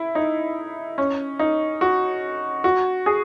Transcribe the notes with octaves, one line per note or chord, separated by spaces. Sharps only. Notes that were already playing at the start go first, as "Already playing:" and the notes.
Already playing: E4
D#4
C#4
D#4
F#4
F#4
G#4